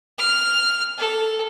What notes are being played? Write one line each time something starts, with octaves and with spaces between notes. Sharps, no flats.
F6
A4